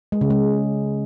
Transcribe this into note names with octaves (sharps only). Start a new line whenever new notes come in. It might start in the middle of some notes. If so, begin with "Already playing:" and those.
G#3
C#3
G#3